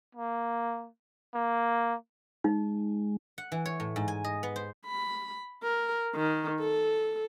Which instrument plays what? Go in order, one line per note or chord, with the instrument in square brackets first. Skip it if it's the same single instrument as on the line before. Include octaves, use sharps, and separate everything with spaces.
[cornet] A#3
A#3
[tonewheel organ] G#3 [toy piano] D#4
[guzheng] F#5
E3
C#5
A2
G#2
G#5
D#5
B3
C5
[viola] B5
A#4
D#3
A4